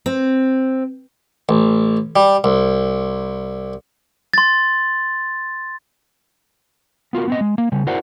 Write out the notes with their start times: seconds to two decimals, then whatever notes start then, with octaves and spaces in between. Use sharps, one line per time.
0.06 C4
1.49 A1
2.16 G3
2.44 C2
4.34 C6 A6
7.13 B3 F4 F#4 A#4
7.28 B3 C4 D#5
7.41 G#3
7.58 A#3
7.72 C#3 G3
7.87 E4 F#4 A#4 C5 D5 F#5